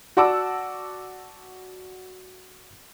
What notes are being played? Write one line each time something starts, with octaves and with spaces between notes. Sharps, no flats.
F#4 D5 F#5 A5 D6 E6